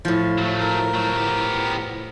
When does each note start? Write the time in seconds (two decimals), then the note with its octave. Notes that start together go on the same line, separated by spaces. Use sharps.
0.05 A2 F3
0.38 F#3 A3
0.61 A#4
0.94 F#3 A3
1.17 B3 G4